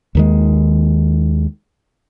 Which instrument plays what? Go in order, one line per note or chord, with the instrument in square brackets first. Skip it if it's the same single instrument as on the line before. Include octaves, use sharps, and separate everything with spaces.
[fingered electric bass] D#2 D#3 G#3